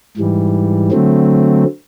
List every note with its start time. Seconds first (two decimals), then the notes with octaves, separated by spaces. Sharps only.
0.17 G#2 E3 G3
0.91 D3 F#3 A3 C4